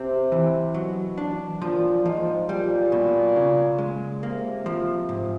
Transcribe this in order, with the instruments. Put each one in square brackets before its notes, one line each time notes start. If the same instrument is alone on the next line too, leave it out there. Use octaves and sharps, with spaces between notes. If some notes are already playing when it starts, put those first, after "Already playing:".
Already playing: [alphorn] C3 [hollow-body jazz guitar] C4
[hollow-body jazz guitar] E3
[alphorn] B2 [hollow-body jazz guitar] F#3
[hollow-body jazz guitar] D4
[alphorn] A#2 [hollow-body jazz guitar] F3
[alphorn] G#2 [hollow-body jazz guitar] F3
[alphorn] A#2 [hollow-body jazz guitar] G3
[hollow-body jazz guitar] B2
C#3
G#3
[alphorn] C3 [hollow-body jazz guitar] A#3
[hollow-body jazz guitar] F3
G#2